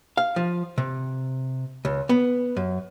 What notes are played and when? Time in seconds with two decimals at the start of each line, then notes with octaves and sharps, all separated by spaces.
0.17 F5
0.36 F3
0.78 C3
1.85 C#2
2.09 B3
2.57 F#2